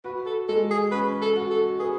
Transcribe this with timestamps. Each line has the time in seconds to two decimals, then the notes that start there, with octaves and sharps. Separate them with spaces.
0.04 F#4 B4
0.26 A4
0.48 G#3 A4
0.71 G#4
0.92 C#4 B4
1.22 A4
1.36 F#4
1.50 A4
1.80 G#4 B4